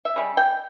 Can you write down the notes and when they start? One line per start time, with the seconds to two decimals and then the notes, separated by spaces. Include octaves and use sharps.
0.05 E5
0.16 C#3 G3
0.37 G5